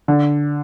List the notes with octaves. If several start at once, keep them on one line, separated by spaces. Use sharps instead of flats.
D3